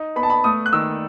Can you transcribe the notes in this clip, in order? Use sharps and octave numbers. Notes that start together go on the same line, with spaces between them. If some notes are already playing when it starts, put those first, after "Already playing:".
Already playing: D#4
B3 B5
A5
B5
A3 D#6
F#6
D#3 E6